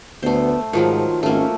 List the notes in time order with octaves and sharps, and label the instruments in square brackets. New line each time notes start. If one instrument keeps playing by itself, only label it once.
[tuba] D2 [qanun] A3 C5 [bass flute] B3
[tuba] G#2 [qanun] D#3 F3 F#3 [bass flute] F4
[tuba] G#1 [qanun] A3 A#3 [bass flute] C#4